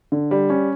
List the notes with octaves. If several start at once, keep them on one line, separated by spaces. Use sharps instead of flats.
D3
G3
C#4